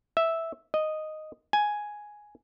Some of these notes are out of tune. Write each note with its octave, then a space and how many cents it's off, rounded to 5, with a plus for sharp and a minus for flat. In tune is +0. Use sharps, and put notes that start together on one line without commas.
E5 -5
D#5 -5
G#5 +5